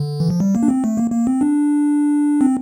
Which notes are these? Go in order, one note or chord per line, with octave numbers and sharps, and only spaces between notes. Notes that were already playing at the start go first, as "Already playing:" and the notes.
Already playing: D3
E3
F3
G3
A#3
D4
C4
A3
A#3
A#3
C4
D4
C4